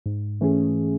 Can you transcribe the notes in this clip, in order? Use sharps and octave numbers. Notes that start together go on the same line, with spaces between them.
G#2
E3 A3 C#4 G#4